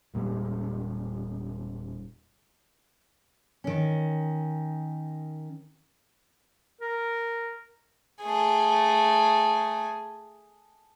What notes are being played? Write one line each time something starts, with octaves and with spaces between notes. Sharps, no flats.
E1 A#2 G3 G#3
D#3 C#4
A#4
A3 G#4